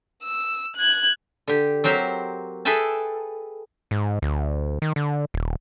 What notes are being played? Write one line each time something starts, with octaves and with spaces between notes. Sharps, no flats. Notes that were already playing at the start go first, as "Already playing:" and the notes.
E6
F#6 G#6
D3 G4
F#3 C4 G4 A#4 C5
G#4 A4 B4 E5 G5 A5
G#2
D2
D#3
D3
D#1